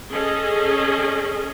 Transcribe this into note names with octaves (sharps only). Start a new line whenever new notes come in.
C#4 G#4 A4 D#5